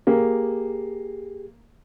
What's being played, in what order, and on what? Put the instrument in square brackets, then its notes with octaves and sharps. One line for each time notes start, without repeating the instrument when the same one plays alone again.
[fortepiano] A#3 [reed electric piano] G4 G#4